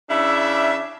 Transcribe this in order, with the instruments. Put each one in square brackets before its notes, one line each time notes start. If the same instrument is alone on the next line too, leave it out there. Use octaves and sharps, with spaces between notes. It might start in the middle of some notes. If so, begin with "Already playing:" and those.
[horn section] C#3 D4 E4 E5